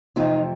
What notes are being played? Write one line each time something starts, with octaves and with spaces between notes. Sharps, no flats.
F2 C3 E3 A3 C4 D#4 F4